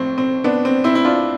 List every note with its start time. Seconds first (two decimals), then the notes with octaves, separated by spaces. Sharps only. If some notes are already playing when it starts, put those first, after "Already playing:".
Already playing: A2 F3 C4
0.18 C4
0.44 B3 D4
0.65 C4
0.84 C4 E4
0.95 E4
1.05 D4 F4